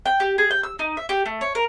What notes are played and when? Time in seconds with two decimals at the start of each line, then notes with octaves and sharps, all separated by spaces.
0.06 G5
0.20 G4
0.38 G#4
0.51 G5
0.63 E6
0.79 D#4
0.97 E5
1.09 G4
1.26 A3
1.41 C#5
1.55 A#4